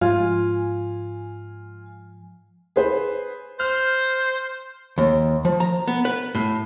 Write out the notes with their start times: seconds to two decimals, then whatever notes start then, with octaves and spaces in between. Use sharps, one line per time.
0.01 G#2 F3 F4 G#5
2.76 G#4 B4 C5
3.60 C5 F6
4.98 D#2
5.45 F3
5.60 A#5
5.88 B3
6.05 B4
6.35 A2